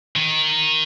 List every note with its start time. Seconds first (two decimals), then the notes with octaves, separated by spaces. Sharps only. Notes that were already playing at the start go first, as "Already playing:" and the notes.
0.16 D#3